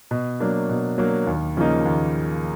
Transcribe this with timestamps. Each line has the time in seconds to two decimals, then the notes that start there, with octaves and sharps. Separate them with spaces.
0.11 B2
0.40 F#3 A#3 D4
0.69 B2
0.98 F#3 A#3 D4
1.27 D#2
1.57 C#3 F3 A#3 D#4
1.86 D#2